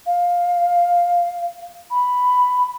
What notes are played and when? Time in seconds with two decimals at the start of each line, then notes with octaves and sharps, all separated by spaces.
0.06 F5
1.91 B5